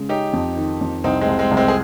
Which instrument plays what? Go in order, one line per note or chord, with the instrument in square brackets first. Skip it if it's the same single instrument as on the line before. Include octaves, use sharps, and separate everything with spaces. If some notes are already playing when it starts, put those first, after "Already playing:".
Already playing: [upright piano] C#3 G#3
[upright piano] C#4 [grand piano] D#4 G4
[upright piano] F2
D#3
F2
[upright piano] C2 [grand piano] C4 D#4
[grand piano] G#3 C4
[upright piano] C2
[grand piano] G#3 C4
[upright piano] C2
[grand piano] G#3 C4
G#4